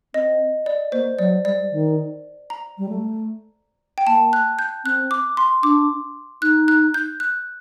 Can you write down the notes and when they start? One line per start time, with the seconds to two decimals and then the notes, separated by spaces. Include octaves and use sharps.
0.14 C4 D#5
0.66 D5
0.92 A#3 C5
1.19 F#3 D5
1.45 G3 D5
1.71 D#3
2.50 A#5
2.78 G3
2.89 A3
3.98 G5
4.07 A#3 A5
4.33 F#6
4.59 G6
4.84 C4 F#6
5.11 D6
5.37 C6
5.63 D4 D6
6.42 D#4 F#6
6.68 F#6
6.94 G6
7.20 F#6